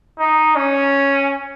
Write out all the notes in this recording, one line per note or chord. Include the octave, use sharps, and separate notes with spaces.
D#4
C#4